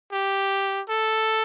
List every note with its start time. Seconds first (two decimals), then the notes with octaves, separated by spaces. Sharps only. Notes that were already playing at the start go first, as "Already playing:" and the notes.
0.12 G4
0.89 A4